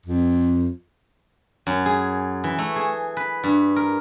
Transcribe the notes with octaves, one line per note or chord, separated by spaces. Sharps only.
F2
F#2
G#4
E3
A3
G#4
B4
G2
A#4